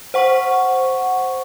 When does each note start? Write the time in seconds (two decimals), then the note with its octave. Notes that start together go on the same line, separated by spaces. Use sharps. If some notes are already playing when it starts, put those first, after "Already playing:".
0.14 C5 F#5 C#6